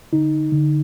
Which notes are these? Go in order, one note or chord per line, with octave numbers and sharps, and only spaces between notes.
D3 D#4
D3